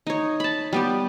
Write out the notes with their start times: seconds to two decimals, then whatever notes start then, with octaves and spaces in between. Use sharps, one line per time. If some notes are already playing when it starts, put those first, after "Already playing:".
0.07 D#4 C#5
0.40 A5 B5
0.73 G3 B3 G4